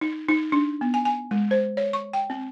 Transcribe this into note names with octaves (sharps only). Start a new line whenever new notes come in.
D#4
D#4
D4
B3
G#5
G#5
G#3
C5
C#5
C#6
G5
C4